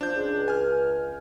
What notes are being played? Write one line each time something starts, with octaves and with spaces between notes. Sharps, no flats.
F3 D4 G6
C#2
G#5 F6